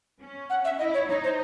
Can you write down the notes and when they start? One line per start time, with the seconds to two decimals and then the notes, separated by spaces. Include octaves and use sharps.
0.21 C#4
0.50 F#5
0.65 E5
0.79 E4 D#5
0.94 C#5
1.08 D#4 C#5
1.24 C5